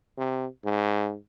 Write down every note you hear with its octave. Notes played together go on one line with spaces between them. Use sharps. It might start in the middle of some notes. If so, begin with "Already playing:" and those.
C3
G#2